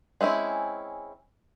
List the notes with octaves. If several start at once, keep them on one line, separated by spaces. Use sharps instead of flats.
G#3 C4 C#4 E4